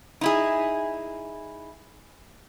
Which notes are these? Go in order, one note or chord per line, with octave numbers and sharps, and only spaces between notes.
D#4 E4 G#4